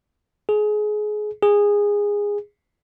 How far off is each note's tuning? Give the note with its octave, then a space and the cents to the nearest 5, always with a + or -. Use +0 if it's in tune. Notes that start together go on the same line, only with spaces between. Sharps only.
G#4 +25
G#4 -15